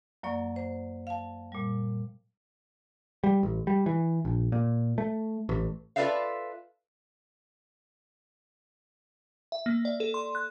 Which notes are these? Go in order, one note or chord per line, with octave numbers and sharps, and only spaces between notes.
F#2 F#3 A#3 D5 C#6
C5
F5 A5
A#2 G3
G3
A1
G3
E3
A#1
A#2
A3
A1
F4 A4 B4 D5 E5 F5
E5
A#3
D5
A4
C6
F#6